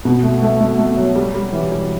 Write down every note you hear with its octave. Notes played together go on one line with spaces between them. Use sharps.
B2
A3
A3
A3
A3
F#3
G3
G3
E3
G3